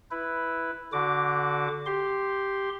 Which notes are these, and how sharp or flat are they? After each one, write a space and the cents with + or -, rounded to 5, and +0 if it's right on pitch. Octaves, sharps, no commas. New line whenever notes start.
E4 +0 B4 +0
D3 -15 F#4 +0 D6 +0
G4 +0 C6 +0